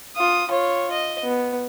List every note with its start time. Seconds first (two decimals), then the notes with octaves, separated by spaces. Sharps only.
0.16 F4 D#6
0.49 F4 C#5
0.91 D#5
1.24 B3